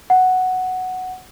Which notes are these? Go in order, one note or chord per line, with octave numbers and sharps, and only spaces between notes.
F#5